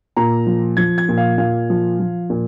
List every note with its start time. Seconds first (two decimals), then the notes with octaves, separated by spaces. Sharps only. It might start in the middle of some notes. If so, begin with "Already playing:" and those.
0.17 A#2 A#5
0.47 F3
0.77 F3 G#6
0.98 G#6
1.08 A#2
1.17 F5
1.38 A#2 F5
1.70 F3
2.00 F3
2.30 A#2